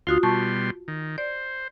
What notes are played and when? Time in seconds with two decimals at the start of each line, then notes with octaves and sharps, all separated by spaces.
0.07 D2 F4 F#4 F5 C6 D#6
0.23 B2 G3 A5 C6 C#6
0.88 D#3
1.18 C5 D5